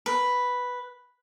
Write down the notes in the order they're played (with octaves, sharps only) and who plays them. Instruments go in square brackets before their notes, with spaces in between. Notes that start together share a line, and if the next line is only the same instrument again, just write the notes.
[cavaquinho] B4